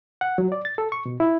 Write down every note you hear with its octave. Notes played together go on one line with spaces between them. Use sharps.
F#5
F#3
D5
A6
A4
C#6
B2
E4